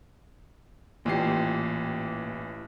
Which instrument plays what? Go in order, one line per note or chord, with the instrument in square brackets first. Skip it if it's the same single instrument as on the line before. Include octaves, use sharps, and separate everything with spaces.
[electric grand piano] A1 E3 C7 [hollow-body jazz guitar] A#2 G4